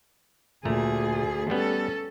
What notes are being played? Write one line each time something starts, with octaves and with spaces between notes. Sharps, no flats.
D2 A#2 A3 G#4 A#5
G3 B3 C#4 A4